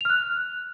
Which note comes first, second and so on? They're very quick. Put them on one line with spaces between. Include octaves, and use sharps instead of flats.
F7 F6 F#6